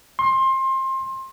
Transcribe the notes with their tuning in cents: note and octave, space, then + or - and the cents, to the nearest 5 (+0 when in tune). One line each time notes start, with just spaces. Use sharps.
C6 +25